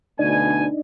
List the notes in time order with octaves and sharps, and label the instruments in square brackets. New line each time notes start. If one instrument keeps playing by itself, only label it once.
[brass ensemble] D2 B2 G#5 [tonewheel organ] D4 D#4